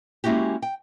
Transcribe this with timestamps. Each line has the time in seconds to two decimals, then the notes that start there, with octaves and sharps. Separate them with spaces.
0.24 G#3 A#3 C#4 E4 F#4 G4
0.62 G5